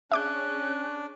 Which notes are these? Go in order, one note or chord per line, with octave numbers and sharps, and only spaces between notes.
C#4 D4 G#4 E5 D6 F#6 G6